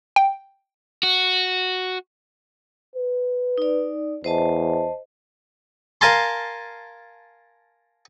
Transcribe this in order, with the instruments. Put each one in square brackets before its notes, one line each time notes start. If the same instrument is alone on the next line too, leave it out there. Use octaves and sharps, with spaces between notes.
[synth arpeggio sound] G5
[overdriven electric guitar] F#4
[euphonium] B4
[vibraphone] D#4 D5
[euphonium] E2 [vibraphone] C5 D#5 A5
[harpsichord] A#4 F5 G#5 A5 C6